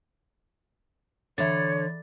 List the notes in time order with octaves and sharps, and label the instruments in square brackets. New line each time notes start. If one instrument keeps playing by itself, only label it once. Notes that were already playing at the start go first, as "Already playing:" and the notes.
[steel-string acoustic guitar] D3 [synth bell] E3 A6 [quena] C#5